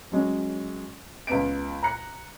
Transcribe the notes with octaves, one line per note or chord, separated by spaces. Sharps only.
F#3 G#3 C#4
C#2 B3 D7
A#5 F#6 C#7